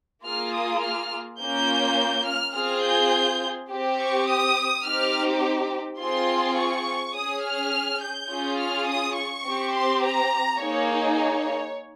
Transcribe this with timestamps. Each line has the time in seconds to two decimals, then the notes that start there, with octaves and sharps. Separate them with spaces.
0.25 A#3 F4 G#4 F6
0.53 D#6
0.82 F6
1.40 A#3 C#4 F4 G6
2.26 F6
2.55 C4 F4 G#4 F6
2.84 G6
3.71 C4 G4
3.99 C#6
4.28 D#6
4.85 C4 D#4 G4 F6
6.00 C4 F4 G#4 C6
6.58 C#6
7.15 C#4 G#4 D#6
7.44 F6
8.02 G6
8.30 C#4 F4 G#4
8.59 F6
8.88 D#6
9.16 C#6
9.46 C4 G4
9.74 C6
10.03 A#5
10.61 A#3 D#4 G#4 C#5
11.18 C#5